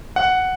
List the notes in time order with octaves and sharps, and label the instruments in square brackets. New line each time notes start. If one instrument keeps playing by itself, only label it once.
[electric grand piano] F#5